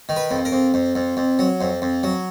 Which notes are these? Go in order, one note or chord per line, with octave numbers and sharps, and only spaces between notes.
D#3
B4
F2
A#4
F2
F2
F2
F2
F#3
F2
F2
F#3